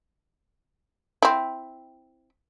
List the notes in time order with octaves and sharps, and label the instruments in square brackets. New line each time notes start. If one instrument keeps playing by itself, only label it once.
[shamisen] C4 E4